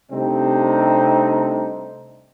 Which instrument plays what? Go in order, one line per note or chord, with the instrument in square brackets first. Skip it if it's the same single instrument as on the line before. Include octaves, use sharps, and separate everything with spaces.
[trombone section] C3 G3 A3 C4 D4 D#4